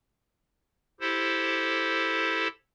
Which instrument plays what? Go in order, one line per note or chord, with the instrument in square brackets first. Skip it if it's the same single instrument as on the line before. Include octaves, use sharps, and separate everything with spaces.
[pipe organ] E4 G4 A4 C5